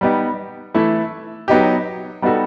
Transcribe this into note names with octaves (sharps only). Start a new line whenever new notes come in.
G3 B3 D#4 G4
E3 A3 E4 A4
F#3 B3 D#4 G4
G3 B3 D#4 F#4 A4